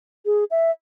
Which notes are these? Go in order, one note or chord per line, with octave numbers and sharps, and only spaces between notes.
G#4
E5